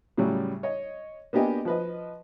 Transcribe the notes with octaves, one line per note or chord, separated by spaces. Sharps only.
A2 C#3 F#3 G3
C#5 D#5
A#3 B3 D4 G4 D#5 G#5
F3 B4 D#5